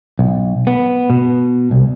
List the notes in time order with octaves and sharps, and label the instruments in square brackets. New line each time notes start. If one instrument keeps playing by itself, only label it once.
[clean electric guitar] B1
B3
B2
C2